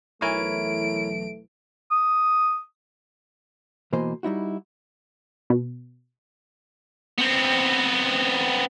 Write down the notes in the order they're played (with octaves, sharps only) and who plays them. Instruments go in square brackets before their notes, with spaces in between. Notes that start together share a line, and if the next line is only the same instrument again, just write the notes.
[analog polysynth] B1 E3 [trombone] A3 [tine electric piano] E4 A#4 C#5 [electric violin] D7
[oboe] D#6
[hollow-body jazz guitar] B2 E3 A#3 C5 D#5
G3 D#4 E4 F#4
[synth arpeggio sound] B2
[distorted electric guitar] B3 C4